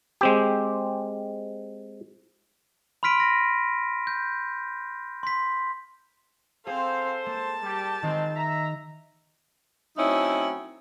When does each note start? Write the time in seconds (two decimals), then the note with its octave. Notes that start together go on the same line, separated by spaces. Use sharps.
0.21 G#3 C4 G4
3.03 B5 C6 F6 B6 D7 D#7
3.20 A#6
4.07 G6
5.23 C6 B6
6.67 C4 G#4 A4 C5 F5
7.26 A#3 A5
7.63 G3 G4
8.03 D#3 G#3 C4 D#4
8.36 E5 A#5
9.97 F#3 A3 C4 C#4 D#4 E4